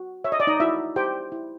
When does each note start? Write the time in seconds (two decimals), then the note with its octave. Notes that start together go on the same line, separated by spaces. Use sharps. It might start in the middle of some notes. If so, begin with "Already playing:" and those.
Already playing: F#4
0.24 C#5 E5
0.32 D#5
0.40 D5
0.47 D#4 D#5
0.60 E4 F#4 E5
0.96 G4 C5 G5
1.32 E4